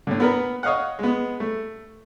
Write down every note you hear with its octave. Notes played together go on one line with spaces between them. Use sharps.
A2 D3
B3 A#4 B4
C#5 D#5 F5 F#5
G#3 B3
A3